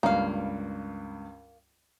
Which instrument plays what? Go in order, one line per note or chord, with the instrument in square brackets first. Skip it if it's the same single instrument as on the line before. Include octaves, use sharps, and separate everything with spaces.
[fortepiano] C#2 G2 [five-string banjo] A#3 F5